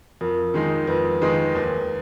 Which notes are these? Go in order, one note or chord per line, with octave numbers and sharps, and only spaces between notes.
F2 A#4
D#3 G#3 D#4
F2 B4
D#3 G#3 D#4 B4
D#2